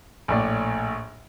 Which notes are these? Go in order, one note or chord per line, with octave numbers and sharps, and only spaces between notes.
A#1 A2 D5